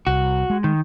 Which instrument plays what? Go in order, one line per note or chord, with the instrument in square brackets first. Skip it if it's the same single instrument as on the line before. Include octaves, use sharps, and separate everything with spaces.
[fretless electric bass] C2 [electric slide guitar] F#4
[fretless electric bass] G#3
[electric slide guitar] D#3